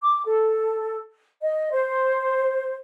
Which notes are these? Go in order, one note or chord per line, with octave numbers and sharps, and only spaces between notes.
D6
A4
D#5
C5